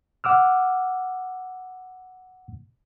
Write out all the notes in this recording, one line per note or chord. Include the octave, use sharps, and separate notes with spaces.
F#5 D6 E6 F6